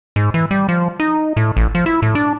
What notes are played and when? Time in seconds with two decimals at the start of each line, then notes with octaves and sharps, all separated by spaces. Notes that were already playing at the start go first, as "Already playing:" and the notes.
0.16 G#2
0.34 E3
0.51 G3
0.69 F3
1.00 D#4
1.37 A2
1.57 A1
1.75 F3
1.86 E4
2.02 A2
2.15 D4